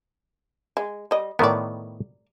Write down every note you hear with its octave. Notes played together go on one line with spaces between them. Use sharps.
G#3
G3 D#5
A2 D#3 B3 A#4 D5